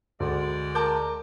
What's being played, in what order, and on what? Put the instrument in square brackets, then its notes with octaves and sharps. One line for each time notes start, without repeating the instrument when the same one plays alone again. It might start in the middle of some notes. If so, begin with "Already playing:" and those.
[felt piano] D2 [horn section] G#3 D5
[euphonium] A#4 [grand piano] A5 D6 G6